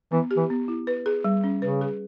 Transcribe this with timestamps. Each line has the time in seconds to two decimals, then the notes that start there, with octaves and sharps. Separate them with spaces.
0.12 E3 B3
0.31 G4
0.37 E3
0.50 B3
0.68 E4
0.87 B4
1.06 G#4
1.24 G3
1.44 C#4
1.62 C#3 B4
1.81 G#4